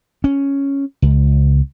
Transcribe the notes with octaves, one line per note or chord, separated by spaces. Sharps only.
C#4
C#2